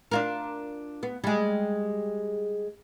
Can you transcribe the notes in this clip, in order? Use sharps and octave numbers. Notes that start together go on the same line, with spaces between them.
D4 F4 A#4
B3
G3 G#3